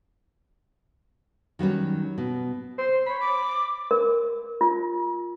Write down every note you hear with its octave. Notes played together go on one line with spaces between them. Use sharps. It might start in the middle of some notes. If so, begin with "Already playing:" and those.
D#3 F#3 G3 C#4
B2
C5
C#5 B5
D6
A#4
F4